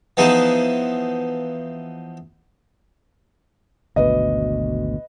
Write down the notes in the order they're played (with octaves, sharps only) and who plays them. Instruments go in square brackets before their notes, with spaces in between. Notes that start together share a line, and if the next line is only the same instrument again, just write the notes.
[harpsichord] E3 F3 B3 D#4 G#4
[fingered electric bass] G#1 D2 B2 [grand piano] B4 D#5